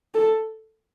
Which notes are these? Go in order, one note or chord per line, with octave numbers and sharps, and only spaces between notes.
A4